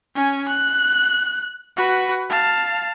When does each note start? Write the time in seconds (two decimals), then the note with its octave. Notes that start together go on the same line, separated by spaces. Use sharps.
0.15 C#4 G#5
0.48 F#6
1.77 F#4 B4
2.29 F5 A5